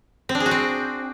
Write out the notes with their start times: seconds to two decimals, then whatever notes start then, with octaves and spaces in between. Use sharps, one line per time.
0.29 C4
0.35 D4
0.40 G#4
0.46 F#4
0.51 C4